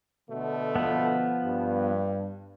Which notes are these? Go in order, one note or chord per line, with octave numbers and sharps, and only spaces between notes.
B2 D3 A3
F3 B3
G2